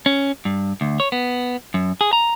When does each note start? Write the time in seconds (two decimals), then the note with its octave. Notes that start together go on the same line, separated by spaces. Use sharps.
0.06 C#4
0.45 G2
0.81 D2
1.00 C#5
1.12 B3
1.74 F#2
2.01 G#4
2.13 A#5